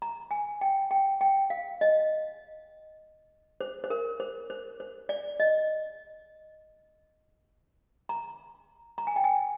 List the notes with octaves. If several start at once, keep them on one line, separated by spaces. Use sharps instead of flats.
A#5
G#5
G5
G5
G5
F5
D#5
C5
C5
A#4
C5
C5
C5
D5
D#5
A#5
A#5
G#5
G5
G#5